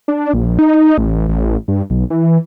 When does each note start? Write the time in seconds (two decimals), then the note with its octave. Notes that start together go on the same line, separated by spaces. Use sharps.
0.08 D4
0.34 A#1
0.59 D#4
0.98 A1
1.28 A1
1.68 G2
1.90 B1
2.10 E3